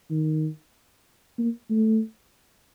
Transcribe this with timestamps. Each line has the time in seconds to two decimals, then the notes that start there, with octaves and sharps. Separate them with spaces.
0.10 D#3
1.38 A#3
1.70 A3